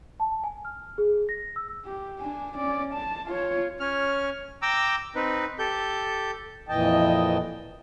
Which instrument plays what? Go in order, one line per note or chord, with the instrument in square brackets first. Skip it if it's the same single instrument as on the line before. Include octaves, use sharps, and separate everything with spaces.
[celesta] A5
G#5
F6
G#4
A#6
E6
[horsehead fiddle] G4
D4 G#5
C#4 D5
A5
F4 C#5
[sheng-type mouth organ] C#4 F6
G5 A#5 D6 E6
C4 D#4 B4
G4 A4 G6
[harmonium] F2 A#2 E3 D#5 G5 A5